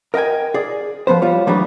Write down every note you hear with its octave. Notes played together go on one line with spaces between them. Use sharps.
A#4 D#5 F5 G5 G#5
G#4 D5
F3 B3 B4 C5
G3 F4 C#5
E3 F#3 G3 A3 B3 D4